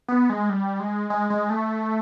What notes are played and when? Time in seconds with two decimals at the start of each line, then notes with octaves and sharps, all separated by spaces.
0.08 B3
0.30 G#3
0.50 G3
0.80 G#3
1.10 G#3
1.30 G#3
1.50 A3